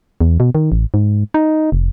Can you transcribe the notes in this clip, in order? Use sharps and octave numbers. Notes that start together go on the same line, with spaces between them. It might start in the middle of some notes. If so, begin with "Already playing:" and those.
E2
B2
D#3
A1
G#2
D#4
F1